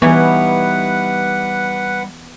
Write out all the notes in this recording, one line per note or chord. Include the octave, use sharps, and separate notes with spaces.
E3 G3 B3 D#4 B4 C#5 F#5